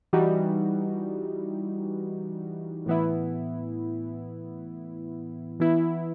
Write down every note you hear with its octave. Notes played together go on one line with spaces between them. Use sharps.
E3 G3 D#4 F#4
A2 E3 B3 E4
E3 B3 E4